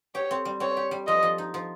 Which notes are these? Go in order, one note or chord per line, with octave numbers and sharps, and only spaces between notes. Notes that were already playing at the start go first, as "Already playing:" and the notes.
G4 C#5
C4
G3
C4 C#5
G4
G3
F3 D#5
F3
D#4
F3